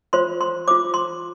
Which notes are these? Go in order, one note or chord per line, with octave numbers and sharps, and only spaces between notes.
F4 C5 C6
C6
F4 C5 D6
C6